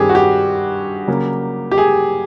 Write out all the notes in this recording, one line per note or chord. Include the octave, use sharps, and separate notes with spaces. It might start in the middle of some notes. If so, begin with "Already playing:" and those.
Already playing: G2 D#3 G3 C4 G4 G#4
F#4
G4
C#3 F#3 A#3
G4
G#4